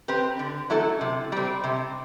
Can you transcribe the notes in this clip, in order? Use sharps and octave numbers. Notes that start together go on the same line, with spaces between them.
C4 G4 B4
D3
F#3 A3 E4 A4
C3
G3 C4
C3